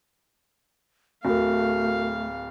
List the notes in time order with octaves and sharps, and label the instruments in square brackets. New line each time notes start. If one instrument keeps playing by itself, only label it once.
[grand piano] D1 [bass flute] A3 [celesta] F#4 A#4 [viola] F5